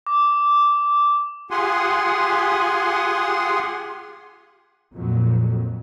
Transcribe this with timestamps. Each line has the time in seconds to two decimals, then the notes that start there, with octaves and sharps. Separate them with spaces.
0.07 D6
1.51 F4 G4 G#4 F#5 G#5 C6
4.93 F2 A#2 F#3